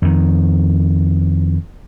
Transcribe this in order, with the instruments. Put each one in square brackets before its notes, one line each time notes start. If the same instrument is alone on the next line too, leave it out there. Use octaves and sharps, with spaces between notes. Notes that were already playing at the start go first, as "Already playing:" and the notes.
[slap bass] F2 D#3